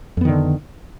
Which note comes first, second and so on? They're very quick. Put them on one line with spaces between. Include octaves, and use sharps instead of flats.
F2 B3 D#3 D3